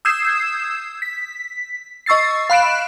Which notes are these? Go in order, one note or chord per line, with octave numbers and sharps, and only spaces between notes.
D#6 E6 G6 G#6 C7 E7
B6
D#5 C#6 E6 A6 C7
F5 B5 F#6 D7 E7